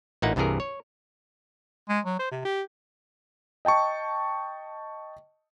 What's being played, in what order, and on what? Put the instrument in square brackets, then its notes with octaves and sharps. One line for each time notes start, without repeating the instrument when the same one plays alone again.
[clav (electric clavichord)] A1 A#2 A#3 D#4 E4 F#5
C2 G2 C3 E3 G#4 A#4
C#5
[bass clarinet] G#3
F#3
C5
C3
G4
[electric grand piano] D#5 G5 A5 C#6